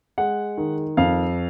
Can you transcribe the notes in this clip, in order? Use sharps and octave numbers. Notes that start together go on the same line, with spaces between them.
G#3 F#5
D#3
F2 F5